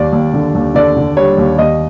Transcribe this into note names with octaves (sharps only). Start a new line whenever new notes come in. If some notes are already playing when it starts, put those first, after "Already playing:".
Already playing: D#2 D5
D#2
D3
D#2
D3 D5
D3
G3 C#5
D#2
D#2 D#5